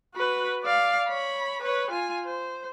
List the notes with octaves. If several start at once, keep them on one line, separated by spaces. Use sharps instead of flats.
F#4 B4
D5 F5
C#5 B5
B4 C#5
F4 G#5
C5